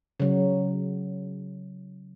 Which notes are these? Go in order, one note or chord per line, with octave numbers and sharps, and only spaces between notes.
C#3 F#3